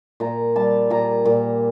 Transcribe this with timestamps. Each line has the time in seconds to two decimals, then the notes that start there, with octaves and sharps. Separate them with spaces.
0.20 A#2 A#5
0.56 G3 A5
0.90 A#2 A#5
1.26 A#2